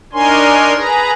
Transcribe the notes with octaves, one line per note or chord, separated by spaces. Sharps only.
D4 D#4 A#4 C#5 G#5 C6
G#4 B4 A#5